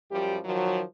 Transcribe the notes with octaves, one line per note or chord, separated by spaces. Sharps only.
F#2 F3 G3 G4
D#3 F3 F#3